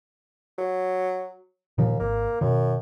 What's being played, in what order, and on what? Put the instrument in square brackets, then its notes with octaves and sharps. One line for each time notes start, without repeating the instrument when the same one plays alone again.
[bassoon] F#3
[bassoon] D#2 [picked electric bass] A#2 D#3 F3
[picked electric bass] G#1 [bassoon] A#3
[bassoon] F#2 [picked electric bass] B2 D#3